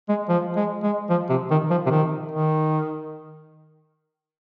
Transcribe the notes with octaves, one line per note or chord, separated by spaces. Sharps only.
G#3
F3
G#3
G#3
F3
C3
D#3
F3
C3
D#3
D#3